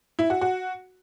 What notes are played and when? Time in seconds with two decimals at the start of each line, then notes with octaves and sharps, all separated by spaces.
0.19 E4
0.30 F#4
0.41 F#4